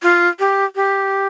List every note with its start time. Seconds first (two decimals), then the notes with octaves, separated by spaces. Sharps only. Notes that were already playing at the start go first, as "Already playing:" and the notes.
0.03 F4
0.39 G4
0.76 G4